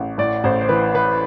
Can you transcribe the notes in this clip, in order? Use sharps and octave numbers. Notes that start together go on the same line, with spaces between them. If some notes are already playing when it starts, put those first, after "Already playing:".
Already playing: A1
A2 D5
A1 C5
C5
E3 B4
E3 B4